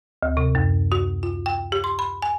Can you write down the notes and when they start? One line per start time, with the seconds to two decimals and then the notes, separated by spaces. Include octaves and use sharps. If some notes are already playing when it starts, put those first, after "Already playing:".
0.23 D2
0.37 C3
0.55 F#2
0.92 F#4
1.23 F4
1.46 G5
1.72 G4
1.84 C6
1.99 B5
2.22 G#5